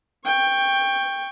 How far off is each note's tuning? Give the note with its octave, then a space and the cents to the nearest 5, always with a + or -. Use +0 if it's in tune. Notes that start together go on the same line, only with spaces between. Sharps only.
G5 +15 C#6 +0